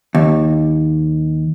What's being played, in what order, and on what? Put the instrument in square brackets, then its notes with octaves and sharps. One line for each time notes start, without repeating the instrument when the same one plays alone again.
[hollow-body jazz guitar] D#2